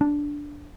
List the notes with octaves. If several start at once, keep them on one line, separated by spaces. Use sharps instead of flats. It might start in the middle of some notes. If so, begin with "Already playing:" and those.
D4